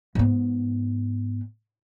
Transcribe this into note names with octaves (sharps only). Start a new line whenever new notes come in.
G#2 B3